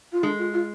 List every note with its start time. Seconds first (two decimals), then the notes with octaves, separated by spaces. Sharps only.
0.12 F4
0.23 G#3 D4
0.38 F4
0.54 F4